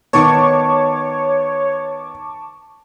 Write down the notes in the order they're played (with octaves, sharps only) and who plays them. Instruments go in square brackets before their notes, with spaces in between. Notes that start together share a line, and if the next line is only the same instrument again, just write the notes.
[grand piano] D#3 B3 [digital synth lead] C#5 [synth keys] A5 C#6 D6